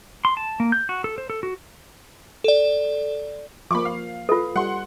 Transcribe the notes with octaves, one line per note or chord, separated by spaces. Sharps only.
C6
A5
A#3
G6
F#4
A4
C5
A4
F#4
A4 D5
F3 A#3 B5 C#6 D6
F5
F4 A4 B4
G3 F#5 C6